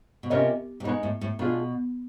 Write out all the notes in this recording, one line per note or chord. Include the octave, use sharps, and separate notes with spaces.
B2
C3 C#4 F4 A#4 D#5
C3
B2 G#3 B3 D#4
A2
A2
B2 A3 D4 F4 G#4